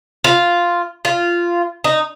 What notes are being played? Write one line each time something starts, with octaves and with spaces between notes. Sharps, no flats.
F4
F4
D#4